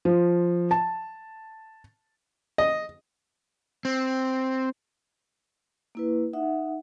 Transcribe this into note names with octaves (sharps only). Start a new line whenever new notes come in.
F3
A5
D#5
C4
A#3 E4 B4
D#4 E5 F#5